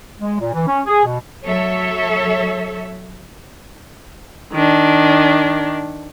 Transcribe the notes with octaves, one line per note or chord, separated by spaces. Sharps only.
G#3
A#2
E3
C#4
G#4
B2
F#3 A4 C#5 E5
D#3 D4